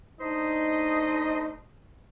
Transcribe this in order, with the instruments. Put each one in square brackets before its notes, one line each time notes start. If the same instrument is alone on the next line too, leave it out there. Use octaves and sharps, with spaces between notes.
[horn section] A3 D4 D#4 C5 D#5